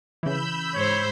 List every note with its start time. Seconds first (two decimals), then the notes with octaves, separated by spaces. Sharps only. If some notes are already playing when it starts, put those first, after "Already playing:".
0.23 C#3 E3 B5 E6 G6
0.75 G#2 C5 C#5